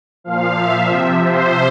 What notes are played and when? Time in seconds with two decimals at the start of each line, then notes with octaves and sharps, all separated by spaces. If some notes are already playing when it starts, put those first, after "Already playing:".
0.24 A#2 F3 F5
0.57 E5
0.89 C3 F3
1.23 C5